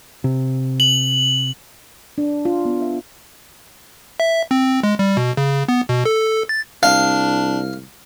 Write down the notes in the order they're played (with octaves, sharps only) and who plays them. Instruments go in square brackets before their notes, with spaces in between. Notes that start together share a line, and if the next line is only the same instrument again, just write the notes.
[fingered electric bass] C3
[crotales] F#7
[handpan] D4
F4
B3
E5
[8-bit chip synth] E5
C4
G#3
G3
B2
C#3
B3
B2
A4
A6
[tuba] C2 [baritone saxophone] D4 [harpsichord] F5